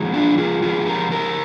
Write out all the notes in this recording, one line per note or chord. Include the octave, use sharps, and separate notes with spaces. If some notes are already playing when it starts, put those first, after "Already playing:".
Already playing: F2 D#3 G#3
D4 F4
F4 G#4
F2 D#3 G#3 F4 G#4
G4 A#4
G4 A#4